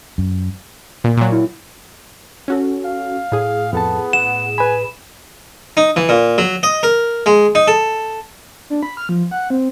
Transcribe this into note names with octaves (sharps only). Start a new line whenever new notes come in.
F#2
A#2
A#2 F#3
E4
C#4 F#4 A4
F5
A2 G#4
F2 B3 A4 A5
F#5 E7
B4 G#5 B5
D#4
E3
A#2
F#3
D#5
A#4
G#3
D#4
A4
D4
B5
F6
F3
F#5
C4